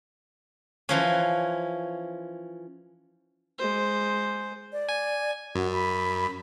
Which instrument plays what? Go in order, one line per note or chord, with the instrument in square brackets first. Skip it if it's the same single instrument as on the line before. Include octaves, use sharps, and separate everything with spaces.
[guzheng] E3 F3 C#4
[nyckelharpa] G#3 C5
[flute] D5
[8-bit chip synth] G#5
[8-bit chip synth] F#2 [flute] F#4
[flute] B5